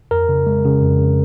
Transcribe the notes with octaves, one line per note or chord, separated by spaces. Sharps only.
F2 A#4
C#3
G#3
C#3
F2
C#3